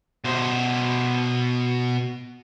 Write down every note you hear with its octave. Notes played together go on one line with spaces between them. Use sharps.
B2 C5